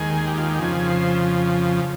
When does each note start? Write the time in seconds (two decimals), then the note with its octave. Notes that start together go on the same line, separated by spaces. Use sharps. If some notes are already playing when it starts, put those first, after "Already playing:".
Already playing: D#2 D#3 G#3 G#4
0.27 G4
0.37 F4
0.48 G4
0.59 F2 C#3 F3 G#4
0.90 C5